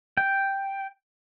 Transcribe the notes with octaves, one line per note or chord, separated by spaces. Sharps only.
G5